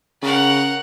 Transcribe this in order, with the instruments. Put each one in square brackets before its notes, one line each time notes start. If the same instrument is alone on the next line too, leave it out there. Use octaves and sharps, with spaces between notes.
[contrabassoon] C#3 [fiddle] A#4 F#5